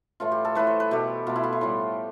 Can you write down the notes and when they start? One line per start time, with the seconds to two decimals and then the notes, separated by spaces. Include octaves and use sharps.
0.20 A2 E3 A3 F4
0.32 G4
0.45 A4
0.55 A2 E3 A3 B4
0.67 C5
0.80 B4
0.91 B2 A3 G4
1.27 B2 A3 F4
1.36 E4
1.44 F4
1.53 E4
1.61 A2 G3 F4